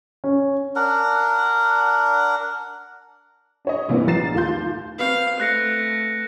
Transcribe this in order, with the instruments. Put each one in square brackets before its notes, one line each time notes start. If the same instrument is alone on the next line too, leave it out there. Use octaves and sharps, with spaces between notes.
[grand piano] C#4
[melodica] D4 A#4 F#5
[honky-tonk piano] D4 C#5 D#5
G2 C3 E3 A#3 B3 D4
A#1 A#5 A6 C7 E7
D#2 A3 F4 C6 G6
[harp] C4 F#4 B4 [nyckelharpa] F5
[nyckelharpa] A3 [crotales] F#6 A#6 C#7